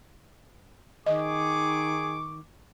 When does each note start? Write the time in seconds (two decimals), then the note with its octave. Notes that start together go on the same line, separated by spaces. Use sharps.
1.06 D#3 G#4 D#5 C#6 D6